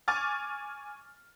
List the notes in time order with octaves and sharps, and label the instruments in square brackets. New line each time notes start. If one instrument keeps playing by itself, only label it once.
[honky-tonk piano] G#5 C#6 D6 F6 A6